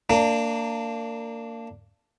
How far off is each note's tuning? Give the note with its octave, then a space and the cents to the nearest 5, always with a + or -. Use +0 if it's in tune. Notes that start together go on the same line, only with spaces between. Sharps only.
A#3 -25 D4 +0